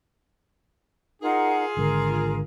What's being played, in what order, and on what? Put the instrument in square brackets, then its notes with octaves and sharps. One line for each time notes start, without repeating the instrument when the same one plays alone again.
[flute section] D#4 A#4 F#5 [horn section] F4 G#4
[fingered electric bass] G#1 D3 G#3 [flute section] A#4